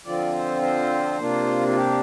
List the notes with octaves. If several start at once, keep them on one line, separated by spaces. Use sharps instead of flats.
D3 F3 C4 F4 D5
C5
C5
C3 A#3 D4 F4
F4
G4